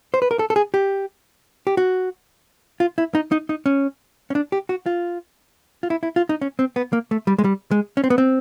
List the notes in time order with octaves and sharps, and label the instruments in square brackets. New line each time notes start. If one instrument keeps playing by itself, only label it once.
[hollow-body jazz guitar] C5
B4
A#4
A4
A4
G#4
G4
G4
F#4
F4
E4
D#4
D#4
D#4
C#4
C#4
D4
G4
F#4
F4
F4
E4
E4
F4
D#4
C#4
C4
B3
A#3
A3
G3
G#3
G3
G#3
C#4
C4
B3
C4